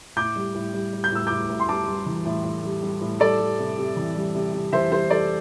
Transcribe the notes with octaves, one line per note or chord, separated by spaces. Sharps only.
A2 D6 G6
G3
A2
G3
G3
G6
A2 E6
A2 D6 G6
A2
C6
G3 A5 D6
G3
E3
A2
A2
G3
G3
A2
G3 A4 D5
G3
C3
C3
E3
G3
C3
C3
E3 C5 E5
G3 C5
G3 A4 D5